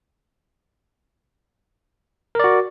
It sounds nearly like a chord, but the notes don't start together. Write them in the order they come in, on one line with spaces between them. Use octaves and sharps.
A#4 D5 F#4